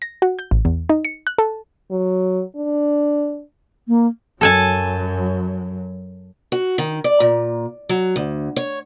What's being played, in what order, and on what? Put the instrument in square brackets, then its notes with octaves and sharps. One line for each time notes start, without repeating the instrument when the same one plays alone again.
[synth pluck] A#6
F#4
G6
A1
E2
D#4
C#7
F#6
A4
[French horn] F#3
D4
[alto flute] A#3
[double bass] F#2 F#3 [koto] A4 G#5 A5
[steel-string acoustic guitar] F#4
D#3
D5
A#2
F#3
D2
C#5